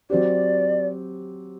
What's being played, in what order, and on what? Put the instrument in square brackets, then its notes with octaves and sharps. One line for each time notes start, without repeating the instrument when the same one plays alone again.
[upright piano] F#3 C4 G4 [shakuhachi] D5